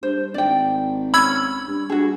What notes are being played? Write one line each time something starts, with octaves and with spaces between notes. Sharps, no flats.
G2 C5
G#1 D5 G5
C#4 B5 E6 G#6
G2
G2 F#4 G#4